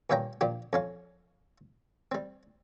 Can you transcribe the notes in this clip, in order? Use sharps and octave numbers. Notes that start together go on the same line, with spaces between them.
G2 A#2 C#4 F5 G5 A#5
A#2 F3 D4 G4
F2 C#4 F5
G3 C4